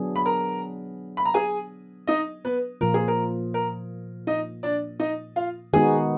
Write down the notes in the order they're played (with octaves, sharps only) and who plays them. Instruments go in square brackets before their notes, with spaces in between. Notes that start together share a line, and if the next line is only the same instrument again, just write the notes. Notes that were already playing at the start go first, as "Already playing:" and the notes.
Already playing: [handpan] F#3 B3 D4 G#4
[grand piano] B5
A#4 A#5
B5
A#5
G#4 G#5
D#4 D#5
B3 B4
[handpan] A#2 F3 A#3 F4 [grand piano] A#4
[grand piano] G#4
A#4
A#4
D#4 D#5
D4 D5
D#4 D#5
F4 F5
[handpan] D#3 G#3 B3 D#4 F#4 [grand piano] G#4 G#5